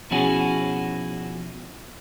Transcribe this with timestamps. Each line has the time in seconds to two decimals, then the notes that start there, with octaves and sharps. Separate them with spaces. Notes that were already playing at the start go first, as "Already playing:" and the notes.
0.11 B2 F3 C#4 E4 F#4 G#4